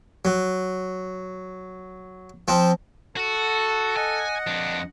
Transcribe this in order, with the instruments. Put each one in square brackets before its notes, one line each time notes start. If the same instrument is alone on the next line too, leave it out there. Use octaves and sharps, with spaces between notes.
[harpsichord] F#3
F3 C4
[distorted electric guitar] F#4 [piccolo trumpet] A4
[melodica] D#5 F#5 [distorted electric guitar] G#5
[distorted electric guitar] F2 D4